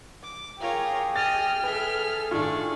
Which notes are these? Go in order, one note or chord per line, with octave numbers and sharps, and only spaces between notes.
D6
F4 G4 G#4 A#4 C#5
D#5 G5 F6 A6
G#4 A4 B4 E5
A2 D#3 D4 F4 C#6